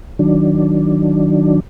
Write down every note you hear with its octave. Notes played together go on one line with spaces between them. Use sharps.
D#3 F#3 D4